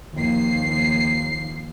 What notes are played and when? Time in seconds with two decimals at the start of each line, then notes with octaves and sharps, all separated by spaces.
0.15 D#2 F3 C7